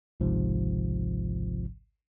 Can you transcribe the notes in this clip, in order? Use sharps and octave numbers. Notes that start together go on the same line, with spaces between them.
G#1 C#2 G#2 C3 F3